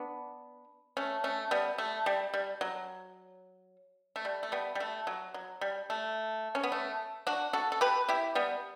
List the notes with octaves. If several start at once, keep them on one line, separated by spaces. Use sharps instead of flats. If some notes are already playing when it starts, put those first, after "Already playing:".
Already playing: B3 D4
A3 C#4
A3 C#4
G3 B3
A3
G3
G3
F#3
A3
G3
A3
G3 B3
G3
A3
F#3
F#3
G3
A3
C#4
B3
A3
D4 F#4
F#4 A4
A4
G4 B4
E4 G4
G3 B3